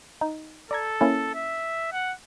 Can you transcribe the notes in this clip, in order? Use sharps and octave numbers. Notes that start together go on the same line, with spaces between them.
D#4
A4 D5 A#5 G#6
A#3 C#4 E4
E5
F#5